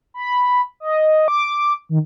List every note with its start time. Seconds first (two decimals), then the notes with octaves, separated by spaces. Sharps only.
0.14 B5
0.80 D#5
1.28 D6
1.89 D#3